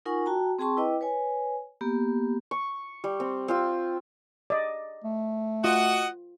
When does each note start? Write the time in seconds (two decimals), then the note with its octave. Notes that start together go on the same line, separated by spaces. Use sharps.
0.06 D#4 F4 A#4 F#5 G#5 C#6
0.26 F#4 G5 A5 A#5
0.59 C4 G#4 G5 A5 C6 C#6
0.77 E4 B4 D#5 G5 D6
1.01 B4 C#5 G#5
1.81 A#3 B3 G4
2.51 C#6
3.04 G3
3.20 C4
3.48 C4 F4 E6
4.50 D5 D#5
5.04 A3
5.64 F4 F#4 D#5 F#5